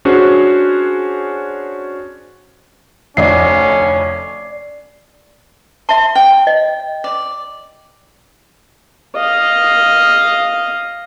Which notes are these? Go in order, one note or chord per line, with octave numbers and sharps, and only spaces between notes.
C#4 D4 F#4 G#4 C5
F1 D2 C#4 D5 D#5 C7
E5 A5 C6
G5
D#5
D5
D#5 F5